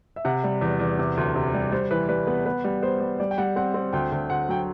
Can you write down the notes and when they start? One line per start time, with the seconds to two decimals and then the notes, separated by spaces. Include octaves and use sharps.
0.16 E5
0.25 C3 F#5
0.44 G3
0.61 E2
0.79 E2
0.99 C3
1.17 D2
1.36 C3
1.54 G3
1.72 G3 C5
1.91 E3 B4
2.09 G3 B4
2.27 B3
2.46 B3 B4
2.64 G3
2.82 B3 C5
3.00 G3
3.20 G3 D5
3.31 G5
3.38 G3 F#5
3.56 C4 F#5
3.74 C4
3.93 D2 G5
4.12 D2
4.30 D2 F#5
4.49 F#3 G5